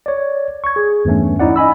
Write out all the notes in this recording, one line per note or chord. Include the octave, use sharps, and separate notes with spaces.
C#5 D5
C#6 G#6
G#4
E2 G2 E3 A3 C#4
C#4 D#4 E4 D5 F#5
D#5 G#5 B5 E6